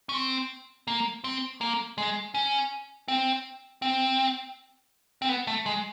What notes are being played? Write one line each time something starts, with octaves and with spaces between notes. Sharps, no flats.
C#4
C4
A#3
C4
A#3
G#3
C#4
C4
C4
C4
B3
A3
G#3